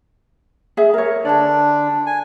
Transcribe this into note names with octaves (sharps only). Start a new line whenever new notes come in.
G#4 E5
A#4 C#5
D3 D4 D5 A5
G#5